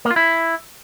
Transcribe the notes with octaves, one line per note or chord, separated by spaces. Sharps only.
A#3
F4
E4